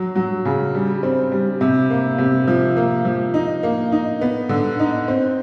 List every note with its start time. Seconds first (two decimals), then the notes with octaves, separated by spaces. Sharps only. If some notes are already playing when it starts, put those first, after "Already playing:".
Already playing: F#3
0.16 F#3
0.45 C#3
0.75 G3
1.03 C4
1.32 G3
1.61 C3
1.90 A#3
2.18 C3
2.47 F3
2.77 A#3
3.05 F3
3.34 D#4
3.63 A#3
3.92 D#4
4.21 B3
4.49 D3
4.79 D#4
5.08 C4